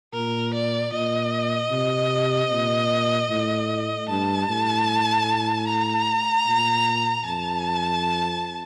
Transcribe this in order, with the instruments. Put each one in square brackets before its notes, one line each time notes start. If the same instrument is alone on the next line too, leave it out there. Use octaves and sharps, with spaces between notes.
[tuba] A#2 [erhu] A#4
[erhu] D5
[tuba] A#2 [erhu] D#5
[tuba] C3
A#2
A2
[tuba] G2 [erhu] A5
[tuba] A2
[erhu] A#5
[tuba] A#2
[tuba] F2 [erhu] A5